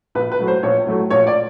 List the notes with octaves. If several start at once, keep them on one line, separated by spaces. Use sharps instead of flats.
A#1 B4
B4
A2 F#3 A3
C5
A#1 C#5
A2 F#3 A3
A#1 C#5
D5